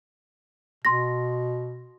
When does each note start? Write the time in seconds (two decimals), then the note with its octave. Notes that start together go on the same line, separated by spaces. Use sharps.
0.85 B2 C6 A#6